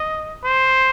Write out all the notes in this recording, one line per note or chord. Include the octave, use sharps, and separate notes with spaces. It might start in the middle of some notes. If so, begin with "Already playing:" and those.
Already playing: D#5
C5